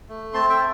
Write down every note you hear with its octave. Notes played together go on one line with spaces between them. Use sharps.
A3
C4 A5 C6
E5 G5